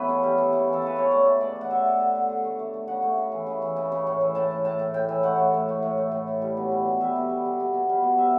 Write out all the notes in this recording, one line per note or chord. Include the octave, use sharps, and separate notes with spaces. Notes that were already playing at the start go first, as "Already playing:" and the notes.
Already playing: E3 A3 B3 C#4 B4
C#3
G3
E3
C#3
E3
A4
C#3 B4
C#3 C#5
A3 D5
C#3
C#3 D5
A3
F#5
D3 E5
D3
D3
D3
D3
A3
A3
A3
C#3 F#5
A3
C#3
E3
C#3
E3
C#3
C#3
A2
E3
A2 A5
A2
A2 A5
A2
A2 G5
E3
A3 F#5
A3
A2
A3
A2
A3
A2
A2
G3
B2
G3
B2
G3 E5
B2
G3
G3
B2
B2
G3
B2
G3 E5